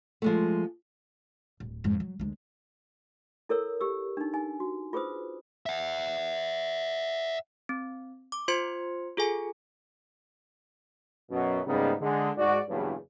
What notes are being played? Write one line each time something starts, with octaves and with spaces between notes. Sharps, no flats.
F3 G#3 A3
D1
F2 G#2
F#3
D2 G#3
E4 A4 A#4 C#5 E6
G4 E6
D4 D#4
D#4 G#5
F#4
F4 G#4 B4 C5 D#6
E5 F#5
C4
D6
F4 C5 C6 G#6 C#7
F4 G#4 A4 G#5
F#2 B2 F#3
G#2 C#3 G3 A#3 B3 D#4
D3 G#3
G#2 F#4 D5
F#1 E2 G2 C#3